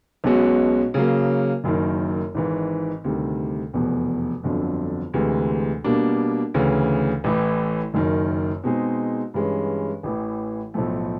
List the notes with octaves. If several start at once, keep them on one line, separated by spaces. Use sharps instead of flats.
B1 B2 G#3 C#4 F#4
C#3 F#3 A#3
F#1 F#2 D#3
G#1 G#2 E3
D2 C3 D#3 G3
F1 E2 B2
G1 F2 D3 F#3
D2 C3 E3 G#3
B2 G3 A#3 D4
D2 C#3 E3
A1 A2 E3 A3
F#1 F#2 D#3
B2 G#3 C4 D#4 G#4
G2 E3 G#3 C#4
A1 A2 E3
B1 A2 F3 A3